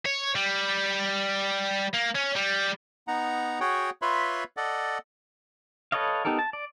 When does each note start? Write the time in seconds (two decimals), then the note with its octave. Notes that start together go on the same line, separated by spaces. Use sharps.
0.06 C#5
0.35 G3
1.93 A#3
2.15 C#4
2.35 G3
3.08 B3 D#4 F#5 A#5
3.60 F#4 G#4 C#5 F#5 G5
4.02 F4 B4 C#5 E5 B5 C6
4.57 A4 D5 D#5 F#5
5.92 A4 B4 C#5 D#5 F5
6.25 B3 D#4 G4 A4 A#4
6.39 A5
6.53 D5